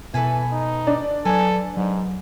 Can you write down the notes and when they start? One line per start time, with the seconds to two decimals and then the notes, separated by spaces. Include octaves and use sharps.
0.14 B2 E3 A4 B4 G#5
0.52 D#4
0.87 D4 D5
1.25 F#3 A4 B4 G#5
1.77 G#2 F#3